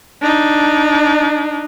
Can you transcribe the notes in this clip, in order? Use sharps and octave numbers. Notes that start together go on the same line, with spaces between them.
D4 D#4